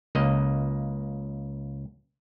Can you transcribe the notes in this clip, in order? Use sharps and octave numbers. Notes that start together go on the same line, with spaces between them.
C#2 A#3 D#5